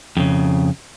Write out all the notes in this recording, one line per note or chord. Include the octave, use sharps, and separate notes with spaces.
F2 C#3